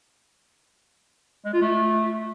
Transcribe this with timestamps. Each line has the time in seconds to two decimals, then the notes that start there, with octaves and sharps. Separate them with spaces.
1.46 G#3
1.54 F4
1.62 A3